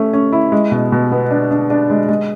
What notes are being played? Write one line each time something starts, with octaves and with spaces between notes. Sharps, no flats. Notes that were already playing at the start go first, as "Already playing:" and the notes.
Already playing: A3 C#4
C#4
E4
G#3
B2
B2
B3
D4
D4
D4
G#3
G#3